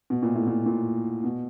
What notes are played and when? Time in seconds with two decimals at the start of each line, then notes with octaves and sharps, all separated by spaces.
0.10 B2
0.23 A#2
0.35 A2
0.47 A#2
0.66 A#2
1.24 B2